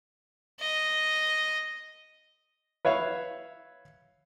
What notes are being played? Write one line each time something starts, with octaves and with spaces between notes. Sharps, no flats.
D#5
B4 C#5 E5 F5